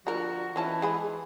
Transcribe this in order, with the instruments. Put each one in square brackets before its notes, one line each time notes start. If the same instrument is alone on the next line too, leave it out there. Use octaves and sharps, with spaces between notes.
[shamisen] D3 A#4 [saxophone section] F3 F#4
[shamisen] D#3 C#4 A5 [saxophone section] E3
[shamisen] G#3 G#4 B5